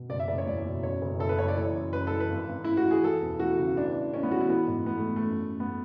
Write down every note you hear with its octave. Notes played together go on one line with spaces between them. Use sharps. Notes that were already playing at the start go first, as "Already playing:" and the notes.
Already playing: B2
F#1 D5
E5
F#1 D5
C#5
E2 D5
B2
F#2 C#5
F#1
F#1 A4
B4
F#1 C#5
D5
E3 C#5
F#2
F#2 B4
E3 A4
B4
G#1
G#1
G#1 E4
F#4
E3
G#4
E3 A4
E1
E3 F#4
C#3
A1 D4
A1
A1 C#4
B3
E3 F#4
E4
E3 B3
G#2
E3 B3
A3
E3
A3
F#2
F#2
B3